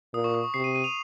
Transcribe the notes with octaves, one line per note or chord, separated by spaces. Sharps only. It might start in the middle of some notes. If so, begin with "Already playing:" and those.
A#2 D#6
C#6
D#6
C#6
C3 C7
D#7
D#7
F7